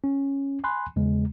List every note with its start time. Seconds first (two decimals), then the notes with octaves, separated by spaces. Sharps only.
0.04 C#4
0.64 G#5 B5 C6 F#6
0.96 E2 C#3 G#3